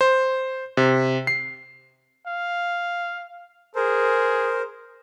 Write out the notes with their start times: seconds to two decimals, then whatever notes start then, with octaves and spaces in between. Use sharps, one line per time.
0.01 C5
0.77 C3
1.27 C7
2.27 F5
3.75 G#4 A#4 C5